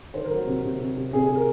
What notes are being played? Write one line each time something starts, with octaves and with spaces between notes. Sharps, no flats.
D#3 C5
A#4
F#3
F#4
C3
C3
C3
C3
C3 G#4
G#4
C3
A#4